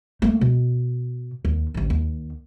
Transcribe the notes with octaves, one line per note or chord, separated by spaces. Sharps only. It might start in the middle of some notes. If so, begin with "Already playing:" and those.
A3 A#3
B2
D#2
A1 D2
D#2